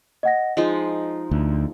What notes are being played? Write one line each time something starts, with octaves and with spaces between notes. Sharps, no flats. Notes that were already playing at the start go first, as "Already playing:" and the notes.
D#5 F#5 A#6
F3 G#3 D#4 D#5
D2